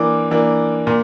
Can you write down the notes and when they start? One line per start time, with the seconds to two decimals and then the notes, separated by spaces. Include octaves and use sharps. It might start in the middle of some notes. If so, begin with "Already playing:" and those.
Already playing: E3 A#3 D4 D6
0.31 E3 A#3 D4
0.87 A#2